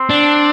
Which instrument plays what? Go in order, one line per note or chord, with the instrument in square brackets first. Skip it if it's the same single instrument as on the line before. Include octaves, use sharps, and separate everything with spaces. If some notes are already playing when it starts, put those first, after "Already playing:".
Already playing: [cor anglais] C4
[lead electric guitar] D4